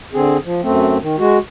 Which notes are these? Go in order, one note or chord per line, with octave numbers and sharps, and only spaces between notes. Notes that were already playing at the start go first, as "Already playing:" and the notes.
D3 C4 G#4
F3
F#2 A3 C4
D#3
G#3 F#4